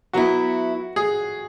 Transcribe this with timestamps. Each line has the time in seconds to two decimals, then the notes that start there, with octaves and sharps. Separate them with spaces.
0.13 F#3 B3 E4 F#4
0.96 G#4